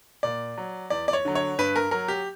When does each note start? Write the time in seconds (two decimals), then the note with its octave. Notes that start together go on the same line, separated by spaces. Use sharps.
0.23 A#2 D5
0.57 F#3
0.90 E2 D5
1.08 D5
1.13 C#5
1.25 D3 F#3
1.35 C#5
1.59 G2 B4
1.76 A#4
1.91 F#3 A#4
2.08 G4